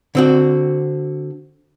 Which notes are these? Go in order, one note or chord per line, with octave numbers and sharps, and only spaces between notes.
D3 C4 F#4